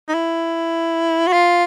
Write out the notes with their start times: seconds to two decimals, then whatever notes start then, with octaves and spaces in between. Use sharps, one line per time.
0.09 D#4
0.14 E4
1.27 F#4
1.33 F4